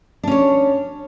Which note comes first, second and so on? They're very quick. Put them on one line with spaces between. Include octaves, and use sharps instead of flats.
D4 C#4 C#5